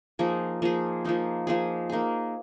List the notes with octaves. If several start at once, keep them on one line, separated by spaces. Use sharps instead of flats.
F3 A#3 D#4 G#4
F3 A#3 D#4 G#4
F3 A#3 D#4 G#4
F3 A#3 D#4 G#4
A#3 D#4 G#4